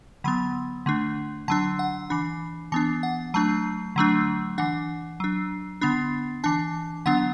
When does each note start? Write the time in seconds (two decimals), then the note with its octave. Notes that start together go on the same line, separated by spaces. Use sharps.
0.24 D3 F#3 B3 B5
0.86 D3 A3 D4
1.48 D3 F#3 D4 A5
1.79 F#5
2.10 E3 D4 B5
2.72 E3 B3 D4 A5
3.03 F#5
3.34 F#3 A3 D4 A5
3.96 D3 F#3 A3 D4
4.58 E3 D4 F#5
5.20 F#3 D4
5.81 D3 B3 D4 B5
6.44 E3 D4 A5
7.06 D3 F#3 B3 D4 F#5